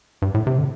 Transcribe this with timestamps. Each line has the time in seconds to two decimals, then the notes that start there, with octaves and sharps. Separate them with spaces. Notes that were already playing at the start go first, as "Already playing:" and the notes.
0.22 G2
0.34 A2
0.47 C3
0.58 D3